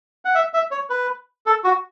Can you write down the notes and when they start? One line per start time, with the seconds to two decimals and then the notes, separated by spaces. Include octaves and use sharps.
0.25 F#5
0.35 E5
0.54 E5
0.71 C#5
0.90 B4
1.46 A4
1.64 F#4